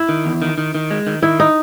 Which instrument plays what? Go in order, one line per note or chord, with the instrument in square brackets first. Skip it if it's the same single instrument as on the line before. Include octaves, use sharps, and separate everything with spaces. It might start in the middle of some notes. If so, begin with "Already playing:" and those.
Already playing: [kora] E4
[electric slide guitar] D#3
E2
D#3
D#3
D#3
G#3
D#3
[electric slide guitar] D#3 [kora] E4
[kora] D#4